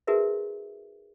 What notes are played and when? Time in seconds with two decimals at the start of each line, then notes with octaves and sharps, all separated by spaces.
0.07 D#4 F#4 G#4 A#4 B4 E5